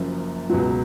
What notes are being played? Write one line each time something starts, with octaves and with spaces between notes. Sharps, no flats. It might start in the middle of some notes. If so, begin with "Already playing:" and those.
Already playing: F#1 F#2 F3
C#2 B2 F#3